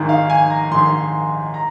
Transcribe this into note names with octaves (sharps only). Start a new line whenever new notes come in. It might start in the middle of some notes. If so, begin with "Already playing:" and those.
Already playing: G#1 G#2 D#3
F5
G#5
A#5
G#1 G#2 D#3 C6
A#5